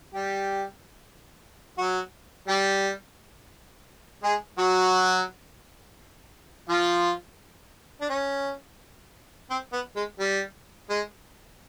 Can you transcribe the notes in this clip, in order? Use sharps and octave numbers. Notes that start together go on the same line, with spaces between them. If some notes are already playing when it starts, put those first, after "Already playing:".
G3 G4
F#3 F#4
G3 G4
G#3 G#4
F#3 F#4
F3 F4
D4
C#4
C4
B3
G#3
G3
G#3